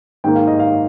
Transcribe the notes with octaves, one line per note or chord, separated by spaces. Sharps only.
G#2 D#3 A#3 G5
F5
D#5
F5